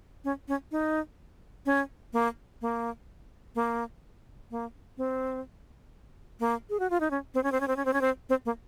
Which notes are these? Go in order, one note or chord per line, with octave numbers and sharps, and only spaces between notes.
C#4
C#4
D#4
C#4
A#3
A#3
A#3
A#3
C4
A#3
G#4
F#4
F4
D#4
C#4
C4
C#4
C4
C#4
C4
C#4
C4
C#4
C4
C4
A#3